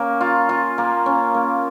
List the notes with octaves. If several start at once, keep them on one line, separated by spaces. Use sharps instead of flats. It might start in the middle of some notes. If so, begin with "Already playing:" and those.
Already playing: A#3 C#4
F4
F4
A#3
C#4
A#3